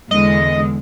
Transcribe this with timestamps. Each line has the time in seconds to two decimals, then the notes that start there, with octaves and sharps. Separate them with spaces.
0.11 E2 D3 G#3 D#5